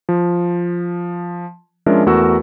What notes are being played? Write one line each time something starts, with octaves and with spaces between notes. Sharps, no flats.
F3
F3 G#3 C#4 D4 A#4 E5
E2 A3 F#4 A#4 E6